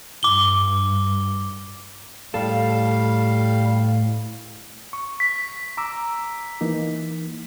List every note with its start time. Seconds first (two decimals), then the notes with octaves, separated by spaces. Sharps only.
0.23 G2 D6 G7
2.34 A2 G3 A4 F5
4.93 C#6
5.20 B6
5.77 A#5 D6 E6
6.61 E3 A#3 D#4